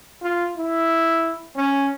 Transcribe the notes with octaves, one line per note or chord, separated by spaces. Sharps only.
F4
E4
C#4